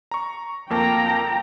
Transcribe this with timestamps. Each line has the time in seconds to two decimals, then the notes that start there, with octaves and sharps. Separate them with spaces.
0.11 A#5 C#6
0.70 F2 A#3 G5 A5 A#5